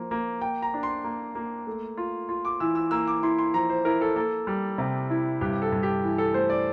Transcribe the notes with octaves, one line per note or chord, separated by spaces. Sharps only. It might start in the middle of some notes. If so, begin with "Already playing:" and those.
Already playing: F3 A#3
A#3
A#3 G5
A#5
D4
C6
A#3
A#3
A3
F4
F4
D6
E3 E6
E6
A#3 E6
D6
E4 C6
C6
F3 A#5
C5
E4 A#4
A4
A#3 A4
G3
C3
E4
G2 G4
A4
G2
G4
E3
A4
A3 C5
D5